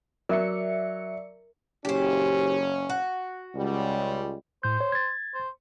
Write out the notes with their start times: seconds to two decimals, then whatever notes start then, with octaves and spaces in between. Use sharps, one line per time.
0.29 F#3 A#4 D5 E5 C#7
1.85 F#1 C#4 G4 C5
2.90 F#4
3.55 C#2 G3
4.63 A2 C5 G6
4.81 C#5
4.92 G#6 A6
5.34 C5